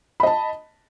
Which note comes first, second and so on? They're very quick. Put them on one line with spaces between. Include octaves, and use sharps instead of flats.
B5 D#5 A5